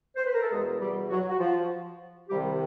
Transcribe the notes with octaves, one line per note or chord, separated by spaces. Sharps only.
C5
B4
A#4
A4
E2 B2 G#3 G#4
G3 G4
F#3 F#4
F#4
F3 F4
C2 C3 D#3 G3 G4